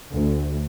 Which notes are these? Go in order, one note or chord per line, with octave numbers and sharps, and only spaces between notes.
D2